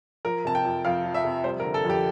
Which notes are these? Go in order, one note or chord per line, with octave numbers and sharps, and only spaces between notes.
F3 A#4
C3 A5
G5
F2
F2 F5
F3
E5
C3
G3 C5
A#4
D3
A4
F2 G4